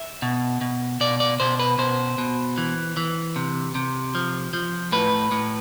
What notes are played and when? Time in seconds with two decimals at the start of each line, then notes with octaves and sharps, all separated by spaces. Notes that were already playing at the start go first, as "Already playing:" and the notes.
Already playing: E5
0.22 B2
0.61 B2
1.01 B2 D5
1.20 D5
1.40 B2 C5
1.59 B4
1.78 B2 C5
2.18 B2
2.58 E3
2.97 E3
3.36 C3
3.75 C3
4.15 F3
4.53 F3
4.92 A2 B4
5.32 A2